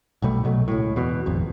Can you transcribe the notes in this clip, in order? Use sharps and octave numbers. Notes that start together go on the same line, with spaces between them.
B1 B2 G3 A3
B1 B2 F#3 A3
C#2 A2
E2 B2
D#1 G#1 F2